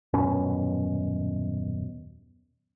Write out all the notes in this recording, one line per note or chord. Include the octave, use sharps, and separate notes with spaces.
D#1 F#2 B2 C#4